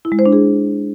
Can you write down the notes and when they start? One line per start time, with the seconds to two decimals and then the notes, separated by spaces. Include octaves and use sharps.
0.05 E4
0.12 G#3
0.19 C5
0.26 D4
0.32 G#4